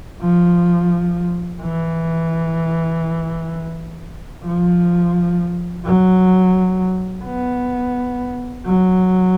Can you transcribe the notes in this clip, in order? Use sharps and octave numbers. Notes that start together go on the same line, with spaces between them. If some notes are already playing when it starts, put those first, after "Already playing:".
F3
E3
F3
F#3
B3
F#3